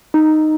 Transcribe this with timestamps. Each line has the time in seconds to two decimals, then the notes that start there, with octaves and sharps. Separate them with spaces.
0.14 D#4